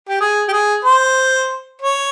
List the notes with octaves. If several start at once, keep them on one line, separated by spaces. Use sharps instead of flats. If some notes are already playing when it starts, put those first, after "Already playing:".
G4
G#4
G4
G#4
C5
C#5